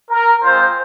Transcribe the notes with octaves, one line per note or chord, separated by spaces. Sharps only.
A#4
G#3 C4 F4 C5